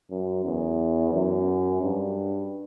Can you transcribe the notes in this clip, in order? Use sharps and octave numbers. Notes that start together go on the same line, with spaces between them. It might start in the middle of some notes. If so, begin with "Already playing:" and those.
F#2
E2
F#2
G2